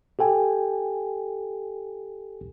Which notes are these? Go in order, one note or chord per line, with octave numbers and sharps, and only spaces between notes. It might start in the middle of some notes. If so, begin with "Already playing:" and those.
G4 A4 G5 G#5